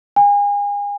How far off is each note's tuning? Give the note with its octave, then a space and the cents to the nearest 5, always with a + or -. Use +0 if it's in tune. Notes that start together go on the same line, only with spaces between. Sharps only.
G#5 -35